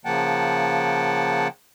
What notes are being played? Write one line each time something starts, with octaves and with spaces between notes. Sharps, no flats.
C#3 F3 A#3 F#5 G5 A5